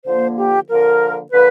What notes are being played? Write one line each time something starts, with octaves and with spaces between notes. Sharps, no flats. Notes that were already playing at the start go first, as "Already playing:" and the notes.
D3 F3 A#3 C5
G4
D3 F3 A#3 A#4
D3 F3 A#3 B4